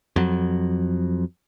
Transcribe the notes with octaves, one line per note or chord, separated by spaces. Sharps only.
F2 F#3